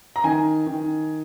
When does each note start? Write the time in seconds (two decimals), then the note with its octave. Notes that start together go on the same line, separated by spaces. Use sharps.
0.16 A#5
0.24 D#3 G#5
0.67 D#3